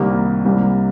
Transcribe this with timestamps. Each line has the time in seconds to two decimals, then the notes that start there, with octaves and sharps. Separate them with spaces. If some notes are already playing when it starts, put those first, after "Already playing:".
Already playing: C2 C3 D#3 G3 A#3
0.45 C2 C3 G3 A#3